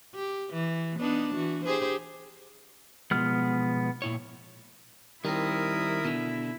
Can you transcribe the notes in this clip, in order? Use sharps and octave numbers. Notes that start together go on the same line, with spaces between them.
G4
E3
B3 D4 D#4
E3 F#4
G4 G#4 C5
B2 F3 G#3 B3 F6
A#2 E4 C#5
D#3 G3 C4 E4 A#4 D#6
B2 D3